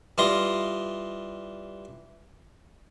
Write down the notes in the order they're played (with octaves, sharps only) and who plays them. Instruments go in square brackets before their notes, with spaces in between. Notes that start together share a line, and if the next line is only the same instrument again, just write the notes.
[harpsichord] E3 G3 F4 D#5 C6 D#6